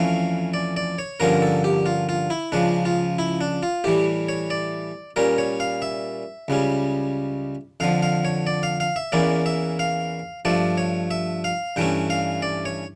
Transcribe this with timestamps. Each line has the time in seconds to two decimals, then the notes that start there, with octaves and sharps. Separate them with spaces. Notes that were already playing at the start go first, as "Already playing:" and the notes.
Already playing: F2 E3 A3 C#4 F5
0.54 D5
0.77 D5
0.99 C#5
1.20 G2 D3 F3 A#3 C#4 A#4
1.42 A4
1.64 G4
1.86 F4
2.09 F4
2.30 E4
2.52 C#2 C#3 F3 D4
2.85 F4
3.19 E4
3.41 D4
3.63 F4
3.84 A2 E3 G3 G4
4.29 C#5
4.50 D5
5.16 A#2 G3 C#4 A#4
5.38 C#5
5.60 F5
5.82 E5
6.48 C#2 C#3 G3 C#4
7.80 F2 D3 F3 F5
8.03 F5
8.25 C#5
8.47 D5
8.63 F5
8.80 F5
8.96 E5
9.12 E2 E3 A#3 C#4 D5
9.46 E5
9.79 F5
10.45 G2 F3 A3 D5
10.78 C#5
11.11 E5
11.44 F5
11.76 G2 E3 A3 C#4 G5
12.10 F5
12.42 D5
12.65 C#5